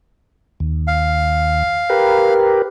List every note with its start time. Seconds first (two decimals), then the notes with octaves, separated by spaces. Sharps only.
0.60 D#2
0.87 F5
1.90 G4 A#4 B4